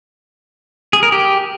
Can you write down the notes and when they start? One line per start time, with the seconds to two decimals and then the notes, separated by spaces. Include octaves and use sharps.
0.93 G#4
1.03 A#4
1.12 G4